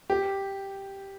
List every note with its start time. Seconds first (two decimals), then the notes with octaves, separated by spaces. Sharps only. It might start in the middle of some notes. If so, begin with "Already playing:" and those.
0.10 G4